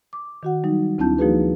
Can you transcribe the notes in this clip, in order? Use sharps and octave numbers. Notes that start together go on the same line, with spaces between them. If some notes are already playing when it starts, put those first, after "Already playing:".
D6
D#3 F#4 F#5
F#3 G3 D#4
D2 C4 D4 E4 A5 G6
F3 A#3 D#4 F#4 G#4 B4